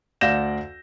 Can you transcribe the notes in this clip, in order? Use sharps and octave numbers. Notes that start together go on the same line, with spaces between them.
D2 D5 F5 G6 A#6 E7